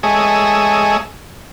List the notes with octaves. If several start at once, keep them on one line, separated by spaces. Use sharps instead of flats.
G#3 A3 G#4 C#5 D#5 E5